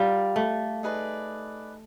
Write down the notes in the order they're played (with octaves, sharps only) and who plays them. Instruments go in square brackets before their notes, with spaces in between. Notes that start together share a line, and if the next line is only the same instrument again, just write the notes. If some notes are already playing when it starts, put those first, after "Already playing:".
Already playing: [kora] G3 [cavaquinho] F4 A#4 D5
[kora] A3
[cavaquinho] D#4 G#4 B4 D5